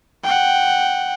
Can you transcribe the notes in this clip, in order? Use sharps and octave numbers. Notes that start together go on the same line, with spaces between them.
F#5 G5